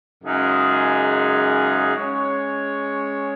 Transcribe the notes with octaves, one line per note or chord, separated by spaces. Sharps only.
F#2 C#3 G#3 D#4 G#4
G#3 C#4 G#4 C#5